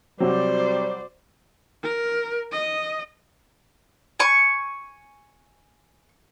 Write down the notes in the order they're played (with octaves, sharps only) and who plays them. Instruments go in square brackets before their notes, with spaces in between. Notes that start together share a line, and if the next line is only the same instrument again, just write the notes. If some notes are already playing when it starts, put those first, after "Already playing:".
[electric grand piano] C3 C4 [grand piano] F#3 F#4 [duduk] G3 [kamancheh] C5 D5
[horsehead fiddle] A#4
D#5
[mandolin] G#5 C#6